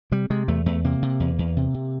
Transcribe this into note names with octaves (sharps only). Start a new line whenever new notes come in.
C3 G3
C3 G#3
E2 A3
E2 A3
C3 A#3
C3
E2
E2
C3
C3